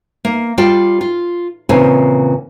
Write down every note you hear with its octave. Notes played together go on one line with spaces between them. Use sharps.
A#3
G3 F4 D5 G5 A5
F4
E2 A#2 C#3 C4 G#5